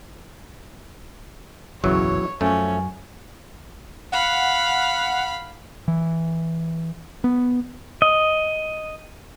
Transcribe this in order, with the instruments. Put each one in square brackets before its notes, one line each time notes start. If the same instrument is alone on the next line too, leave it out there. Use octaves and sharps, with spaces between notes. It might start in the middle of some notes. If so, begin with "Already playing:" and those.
[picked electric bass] F#1 B1 E2 [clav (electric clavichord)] C#3 E3 F#3 [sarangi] C#5
[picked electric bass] F#2 [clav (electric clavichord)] F3 A3 [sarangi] C#4
[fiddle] F5 B5 [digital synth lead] F#5
[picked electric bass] E3
B3
[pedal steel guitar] D#5